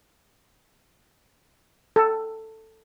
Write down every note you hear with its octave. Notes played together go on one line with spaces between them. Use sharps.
A4